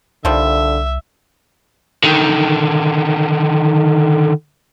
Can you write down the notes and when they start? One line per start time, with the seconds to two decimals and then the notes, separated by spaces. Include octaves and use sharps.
0.25 C2 D3 D#3 F3 G3 E5
2.04 D3 D#3